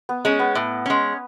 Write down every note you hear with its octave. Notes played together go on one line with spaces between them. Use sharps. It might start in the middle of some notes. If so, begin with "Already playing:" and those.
B3
G#3 C#4
B3
A2
G#3 C#4